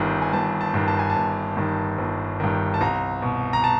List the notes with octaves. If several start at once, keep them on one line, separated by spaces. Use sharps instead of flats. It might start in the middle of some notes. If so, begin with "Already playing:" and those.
Already playing: G1 G2 D#3
G#5
G1 A5
A5
G2 D#3
A5
G#5
A5
G1
G2 D#3
G1
G2 D#3
A5
C2 A#5
B2
A#5
A5